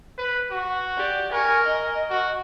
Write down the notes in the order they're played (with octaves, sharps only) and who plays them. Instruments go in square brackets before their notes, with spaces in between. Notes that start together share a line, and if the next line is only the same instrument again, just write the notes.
[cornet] B4
F#4
[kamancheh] G4 D5
[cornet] A#4 [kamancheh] G#5 C#6
[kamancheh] D#5
[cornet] F#4